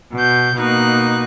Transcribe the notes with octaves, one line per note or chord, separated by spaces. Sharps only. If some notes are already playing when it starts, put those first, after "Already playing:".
B2 G6
B2 A#3 D#4 F#6